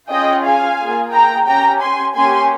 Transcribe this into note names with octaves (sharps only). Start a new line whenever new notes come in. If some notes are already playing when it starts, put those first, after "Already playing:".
C#4 F4 G#4 D#5 G5
F5 G#5
A#3 F4 G#4
G5 A#5
C#4 G4 G5 A#5
G#5 C6
A#3 C#4 G4 G#5 C6